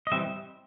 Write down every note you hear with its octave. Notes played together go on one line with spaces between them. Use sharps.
D#5
E3 G3 C4 E5